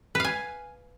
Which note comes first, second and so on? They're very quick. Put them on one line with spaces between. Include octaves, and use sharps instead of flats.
B4 F5 G#5